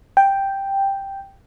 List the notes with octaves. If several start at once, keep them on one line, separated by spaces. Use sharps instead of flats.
G5